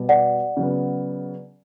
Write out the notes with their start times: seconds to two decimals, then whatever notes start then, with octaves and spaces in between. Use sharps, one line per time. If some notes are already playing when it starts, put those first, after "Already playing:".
Already playing: B2 G3 B3
0.09 D5 F#5
0.57 C#3 F#3 B3